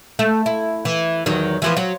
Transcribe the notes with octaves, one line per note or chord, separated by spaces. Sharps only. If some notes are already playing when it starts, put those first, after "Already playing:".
A3
E4
E3
E2 D#3 F#3
E3 F3 B3
F#3